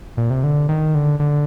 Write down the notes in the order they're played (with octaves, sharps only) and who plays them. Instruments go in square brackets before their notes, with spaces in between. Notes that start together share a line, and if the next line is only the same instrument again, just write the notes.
[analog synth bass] A#2
C3
D3
D#3
D3
D3